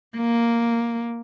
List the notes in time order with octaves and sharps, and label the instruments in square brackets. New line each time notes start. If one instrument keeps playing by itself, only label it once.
[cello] A#3